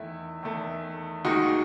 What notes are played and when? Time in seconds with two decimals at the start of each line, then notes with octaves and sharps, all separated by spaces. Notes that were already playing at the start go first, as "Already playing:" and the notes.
Already playing: E2 D#3 A3 E4
0.43 E2 D#3 A3
1.25 D#2 D#3 G#3 D#4 F#4